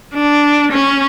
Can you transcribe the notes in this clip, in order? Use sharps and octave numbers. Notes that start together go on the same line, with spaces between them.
D4
C#4